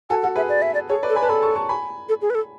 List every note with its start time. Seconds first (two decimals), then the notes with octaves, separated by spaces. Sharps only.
0.10 F#4 A4 G#5
0.23 F#4 A4 F#5
0.36 G#4 B4 E5
0.49 D5
0.62 E5
0.74 D5
0.89 G#4 A4 C#5
1.03 B4 D5
1.09 A4
1.15 G#5 B5
1.21 B4 A5
1.29 A4 G#5 B5
1.42 A5 C#6
1.55 A5 C#6
1.69 G#5 B5
2.09 A4
2.22 G#4
2.30 B4
2.35 A4